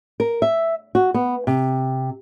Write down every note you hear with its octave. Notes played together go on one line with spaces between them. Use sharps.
A#4
E5
F#4
B3
C3